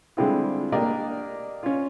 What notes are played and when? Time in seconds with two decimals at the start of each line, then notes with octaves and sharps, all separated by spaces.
0.17 D3 G3 G#3 C4 E4 F4
0.72 A#3 D4 G4 A#4 D5 D#5
1.63 C#4 F4